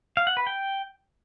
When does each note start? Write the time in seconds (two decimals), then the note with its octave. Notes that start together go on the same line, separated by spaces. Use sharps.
0.17 F5
0.27 F#5
0.37 B4
0.47 G5